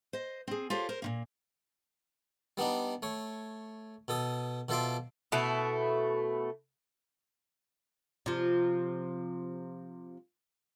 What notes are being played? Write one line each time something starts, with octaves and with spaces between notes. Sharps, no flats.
C5 D#5
C4 G#4
F4 G4 A4 C5 C#5
A#4 C5
A#2 D#3 A#3
G3 B3 D4 D#4
A3 C#5
B2 A4 D#6
B2 F3 A4 E5 C6 D6
B2 A3 E4
C3 F3